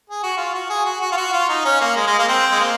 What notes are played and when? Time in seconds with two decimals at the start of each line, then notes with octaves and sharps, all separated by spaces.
0.10 G#4
0.23 F#4
0.37 F4
0.54 F#4
0.70 G#4
0.85 F#4
1.01 F#4
1.12 F4
1.17 F#4
1.33 F4
1.49 D#4
1.65 C#4
1.80 A#3
1.96 G#3
2.07 G#3
2.18 A#3
2.28 C4
2.52 G#3
2.60 A#3